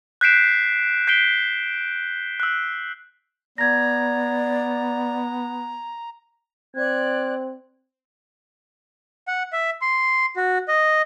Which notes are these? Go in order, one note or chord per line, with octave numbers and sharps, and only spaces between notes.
F#6 G6 B6 C7 D7 E7
G6 B6 C7 D7 G7
E6 F#6
B3 D5 A#5 G#6 A#6
C4 D5 F#6 G#6
F#5
E5
C6
F#4
D#5